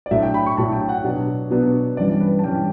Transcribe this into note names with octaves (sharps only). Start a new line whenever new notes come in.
D5
A2 F#3 A3 D4 E5
G5
B5
C#6
A2 F#3 A3 D4 A5
G5
F#5
B2 F#3 B3 D4
B2 F#3 B3 D4
G2 E3 G3 C#4 D5
B4
A5
G2 E3 G3 C#4 G5